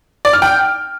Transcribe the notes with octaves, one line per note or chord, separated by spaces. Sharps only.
D5
F6
G5